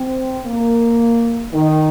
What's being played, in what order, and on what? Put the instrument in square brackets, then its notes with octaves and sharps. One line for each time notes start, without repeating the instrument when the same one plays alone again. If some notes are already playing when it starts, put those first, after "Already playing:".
Already playing: [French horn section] C4
A#3
D#3